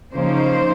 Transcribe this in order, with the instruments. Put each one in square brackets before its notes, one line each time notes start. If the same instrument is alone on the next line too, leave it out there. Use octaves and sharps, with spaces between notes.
[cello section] C#3 F3 A#3 D#4 C5